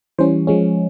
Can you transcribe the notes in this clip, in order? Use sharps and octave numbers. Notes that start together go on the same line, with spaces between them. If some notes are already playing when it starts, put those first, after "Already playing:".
E3 G3 C#4 C5
F3 G#3 C#4